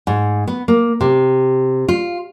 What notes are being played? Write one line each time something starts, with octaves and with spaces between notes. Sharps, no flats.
G#2
B3
A#3
C3
F4